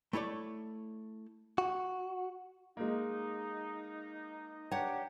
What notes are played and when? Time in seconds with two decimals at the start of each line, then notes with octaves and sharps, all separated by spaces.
0.13 A3 E4 C#5 D5
1.58 F#4
2.77 G#3 A#3 D#4
4.71 D4 G4 C#5 F#5 G5 A#5